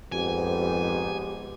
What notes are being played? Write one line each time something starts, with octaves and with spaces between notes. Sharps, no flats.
G#1 F2 G#2 B3 G4 G#5